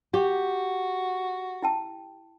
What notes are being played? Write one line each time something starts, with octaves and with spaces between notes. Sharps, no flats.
F#4 G4
E4 G5 A5